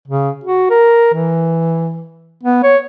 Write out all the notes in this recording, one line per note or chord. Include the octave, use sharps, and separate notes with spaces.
C#3
F#4
A#4
E3
B3
C#5